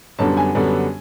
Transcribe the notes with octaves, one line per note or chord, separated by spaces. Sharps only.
F#2 D3 G3 B3 D4 A5
G#5
F#2 D3 G3 B3 D4